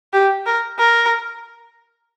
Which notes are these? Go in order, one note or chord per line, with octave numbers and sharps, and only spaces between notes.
G4
A#4
A#4